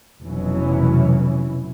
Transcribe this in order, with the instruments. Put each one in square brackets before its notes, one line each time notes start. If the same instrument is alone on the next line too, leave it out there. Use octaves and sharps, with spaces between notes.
[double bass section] F1 B2 E3 F#3 C#4